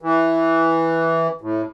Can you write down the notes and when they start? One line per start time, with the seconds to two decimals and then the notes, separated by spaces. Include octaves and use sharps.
0.02 E3
1.41 A2